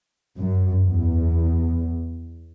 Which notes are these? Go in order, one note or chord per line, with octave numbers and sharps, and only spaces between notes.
F#2
E2